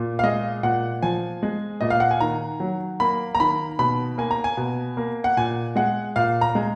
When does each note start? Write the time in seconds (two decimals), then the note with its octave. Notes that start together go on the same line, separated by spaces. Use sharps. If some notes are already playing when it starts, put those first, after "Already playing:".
Already playing: A#2
0.19 F5
0.23 G#3 D#5
0.63 A#2 F#5
1.02 F3 G#5
1.43 G#3
1.81 A#2 D#5
1.90 F5
2.00 F#5
2.11 G#5
2.21 D#3 A#5
2.60 F#3
3.00 A#3 B5
3.35 A#5
3.40 D#3 B5
3.79 B2 B5
4.18 A#3 G#5
4.31 A#5
4.44 G#5
4.57 B2
4.97 A#3
5.24 F#5
5.37 A#2 G#5
5.76 G#3 F#5
6.16 A#2 F5
6.41 A#5
6.55 G#3